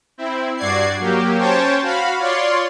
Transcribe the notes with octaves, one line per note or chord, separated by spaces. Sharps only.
C4 E4
G2 F#4 D5 G#6 C7
F#3 A#3 G4
C#4 C5 C#5 G5 A5
F#4 F5 B5
F4 C#5 D5 C6